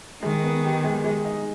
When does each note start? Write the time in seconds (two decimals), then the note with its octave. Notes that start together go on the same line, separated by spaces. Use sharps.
0.23 D#3 G#3
0.43 B3
0.64 G4
0.84 G#3
1.04 G#3
1.25 D#4